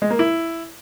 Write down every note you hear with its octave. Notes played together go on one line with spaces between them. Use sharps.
G#3
A#3
E4